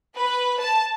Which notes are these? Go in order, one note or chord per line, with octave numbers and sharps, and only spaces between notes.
B4
A5